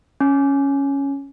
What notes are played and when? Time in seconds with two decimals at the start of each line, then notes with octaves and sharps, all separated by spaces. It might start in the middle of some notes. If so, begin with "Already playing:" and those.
0.20 C#4